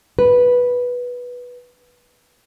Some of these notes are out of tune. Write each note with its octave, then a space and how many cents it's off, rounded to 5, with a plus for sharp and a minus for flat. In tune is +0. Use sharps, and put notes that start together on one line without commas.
B4 -10